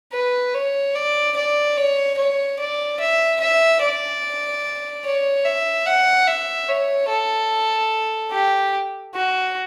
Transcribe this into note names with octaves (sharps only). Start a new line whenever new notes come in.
B4
C#5
D5
D5
C#5
C#5
D5
E5
E5
D5
C#5
E5
F#5
E5
C#5
A4
G4
F#4